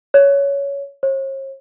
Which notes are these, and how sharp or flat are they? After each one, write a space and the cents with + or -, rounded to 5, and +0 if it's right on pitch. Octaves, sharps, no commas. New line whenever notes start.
C#5 +15
C#5 -45